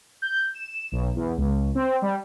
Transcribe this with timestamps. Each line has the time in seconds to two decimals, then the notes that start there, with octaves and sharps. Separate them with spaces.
0.22 G6
0.54 E7
0.92 B1
1.16 E2
1.37 C#2
1.75 C4
2.02 G3